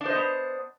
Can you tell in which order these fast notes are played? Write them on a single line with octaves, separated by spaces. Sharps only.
D4 C5 D#5 B3